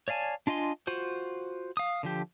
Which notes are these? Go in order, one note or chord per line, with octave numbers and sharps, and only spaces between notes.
C#5 D5 F5 G#5 A5
D4 F4 D#5 G#5 C6
F4 F#4 C5
F5 D#6
D3 F3 G4